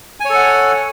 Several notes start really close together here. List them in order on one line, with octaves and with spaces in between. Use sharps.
G#5 C#5 A4 F#5